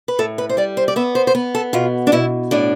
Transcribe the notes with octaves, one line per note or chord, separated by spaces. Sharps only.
B4
A2 A4
B4
C5
G3 D5
C5
D5
B3 E5
C5
C5
B3 B4
A4
B2 F4
D4
B2 E4
A2 D4